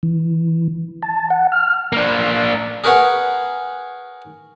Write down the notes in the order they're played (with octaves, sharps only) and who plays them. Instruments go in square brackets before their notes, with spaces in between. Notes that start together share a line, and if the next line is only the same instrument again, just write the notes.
[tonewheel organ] E3
A5
F#5
F6
[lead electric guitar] A#3 D4
[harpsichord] G#4 A#4 B4 C#5 F#5 G#5